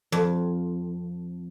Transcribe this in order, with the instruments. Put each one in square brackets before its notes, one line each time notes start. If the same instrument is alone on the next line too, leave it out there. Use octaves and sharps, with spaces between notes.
[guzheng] F2